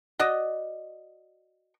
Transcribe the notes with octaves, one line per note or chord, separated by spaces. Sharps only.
F#4 D5 D#5